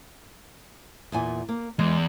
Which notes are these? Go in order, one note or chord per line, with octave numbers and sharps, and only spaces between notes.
E2 A#2 G#5
A#3
E2 G#3